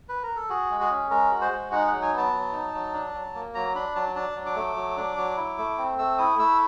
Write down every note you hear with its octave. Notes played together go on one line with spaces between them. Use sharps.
B4
A#4
A4
F#4 G#4
G#3
G#4
C#4
G#3 A#4
F#4
C5
G#3
D#4 F#5
F#5
F#3
G#5
B3 A5
F#3
D#4
F#3
D4
F#3
A#3
F#3 A#5
D4 B5
F#3 A5
D4 A5
F#3
D6
A3
F#3
D4
F#3
E4
A3
C4
A3 E6
E4 D#6
A3 E6